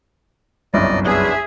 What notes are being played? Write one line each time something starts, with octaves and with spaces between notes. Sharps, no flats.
G1 C2 F#2 D5 D#5
B3 D4 G#4 E5